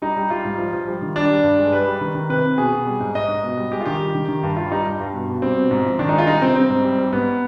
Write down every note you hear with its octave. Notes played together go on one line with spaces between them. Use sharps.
G3 D#4
G3
G3 F4
G#2
F3
F3
G3
D#3
G3 D4
G3
G2
G#3
G3 B4
G3
D#3
D#3
C3 B4
C3
B2 G#4
B2
G3
G#2
G#2 D#5
G#2
B2
G3
G#3 G4
F4
D#3 G4
G3
D#3
D#3
G2
G3 F4
G3 D#4
G2
G2
B2
B2
G3 C4
B2
G#2
F3
D#3 D4
D#4
G#3
F4
G3 D#4
C3 C4
G3 C4
G#2
G3
G3
G#2 B3